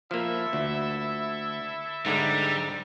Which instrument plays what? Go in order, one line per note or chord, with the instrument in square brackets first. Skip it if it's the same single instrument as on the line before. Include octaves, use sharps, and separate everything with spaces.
[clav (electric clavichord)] F3 A#3 [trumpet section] E4 A4 E5
[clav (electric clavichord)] D2
[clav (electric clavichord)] G#2 D3 G#3 [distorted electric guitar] G3